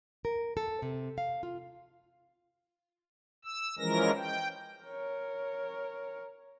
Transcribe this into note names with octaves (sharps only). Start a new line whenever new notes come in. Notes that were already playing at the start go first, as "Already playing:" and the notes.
A#4
A4
C3
F5
F4
E6
E3 F3 G#3 C#4 A#4 A#6
G5
A#4 C#5